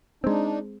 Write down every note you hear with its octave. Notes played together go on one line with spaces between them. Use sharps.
G#3 C4 D4 D#4